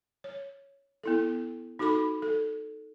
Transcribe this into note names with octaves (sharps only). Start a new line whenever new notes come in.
C#5
B3 E4 A4
D#4 F#4 A4 B5 D6
A4